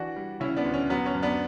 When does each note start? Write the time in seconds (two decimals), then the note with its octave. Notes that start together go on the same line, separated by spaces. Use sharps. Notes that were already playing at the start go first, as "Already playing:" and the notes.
Already playing: E3 D4 F#4
0.16 G3
0.40 C#3 C#4 E4
0.56 B3 D4
0.65 D2
0.74 C#4
0.90 F#3 B3
1.06 C#4
1.14 F#2
1.23 B3 D4